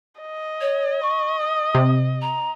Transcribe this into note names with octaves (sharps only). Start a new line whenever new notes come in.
D#5
C#5
C#6
D#6
C3
A#5